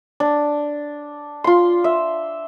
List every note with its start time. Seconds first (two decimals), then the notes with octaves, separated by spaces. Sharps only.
0.20 D4
1.44 F4 C6
1.84 E5